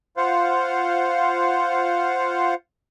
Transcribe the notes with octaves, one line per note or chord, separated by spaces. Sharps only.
F4 C5 F5 F#5